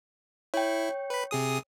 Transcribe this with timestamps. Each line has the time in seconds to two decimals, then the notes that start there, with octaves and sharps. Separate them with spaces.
0.54 E4 C#5 G5
1.10 B4 B5
1.31 C3 G#4 D#6